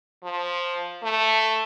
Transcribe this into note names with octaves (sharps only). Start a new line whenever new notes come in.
F3
A3